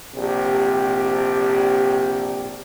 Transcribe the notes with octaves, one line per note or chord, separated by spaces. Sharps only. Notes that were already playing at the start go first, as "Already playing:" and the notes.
A#1 C3 G4